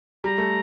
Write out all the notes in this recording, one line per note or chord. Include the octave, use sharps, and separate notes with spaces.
G3 A#5
A3